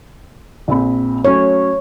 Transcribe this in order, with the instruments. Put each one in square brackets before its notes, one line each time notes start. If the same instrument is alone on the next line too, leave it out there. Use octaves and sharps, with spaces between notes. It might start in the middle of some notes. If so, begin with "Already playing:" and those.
[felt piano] A#1 C4 B5
[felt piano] F#3 A3 C#4 [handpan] C#5